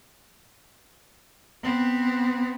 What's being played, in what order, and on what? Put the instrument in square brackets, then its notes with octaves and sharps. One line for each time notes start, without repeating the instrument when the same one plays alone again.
[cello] B3 C4